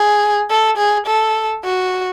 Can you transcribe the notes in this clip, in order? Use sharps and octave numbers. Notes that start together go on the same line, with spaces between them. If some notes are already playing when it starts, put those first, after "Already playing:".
Already playing: G#4
A4
G#4
A4
F#4